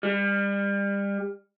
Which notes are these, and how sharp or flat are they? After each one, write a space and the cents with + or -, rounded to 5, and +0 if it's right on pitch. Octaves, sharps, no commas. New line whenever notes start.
G3 +30